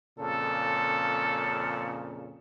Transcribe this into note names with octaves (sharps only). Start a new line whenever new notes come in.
F2 A#2 C#3 A4